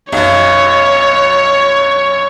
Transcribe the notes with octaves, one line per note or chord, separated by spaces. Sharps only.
B1 F#2 C#5